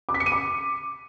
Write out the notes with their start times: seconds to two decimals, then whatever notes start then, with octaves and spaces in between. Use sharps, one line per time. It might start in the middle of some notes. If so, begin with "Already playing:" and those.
0.09 D6
0.14 B6
0.20 C#7
0.26 D#7
0.32 D6